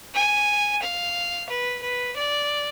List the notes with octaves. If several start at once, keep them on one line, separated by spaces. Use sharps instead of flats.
G#5
F5
B4
B4
D5